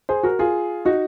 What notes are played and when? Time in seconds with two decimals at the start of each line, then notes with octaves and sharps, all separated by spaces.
0.09 G#4 C5
0.23 F#4 A#4
0.39 F4 G#4
0.85 D#4 F#4